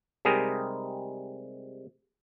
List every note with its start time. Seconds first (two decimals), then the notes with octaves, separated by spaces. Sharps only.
0.25 C3 G3 G#3 D#4 G#4 A#4